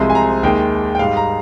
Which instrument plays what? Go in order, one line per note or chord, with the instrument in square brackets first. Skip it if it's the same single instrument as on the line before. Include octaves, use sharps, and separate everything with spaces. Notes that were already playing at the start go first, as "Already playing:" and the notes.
Already playing: [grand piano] C2 C3 F3 G#3 C6
G#5
A#5
D#2 D#3 G#3 G5
G5
G#2 G3 F5
A#5